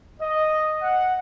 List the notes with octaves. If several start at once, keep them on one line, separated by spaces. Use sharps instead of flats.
D#5
F#5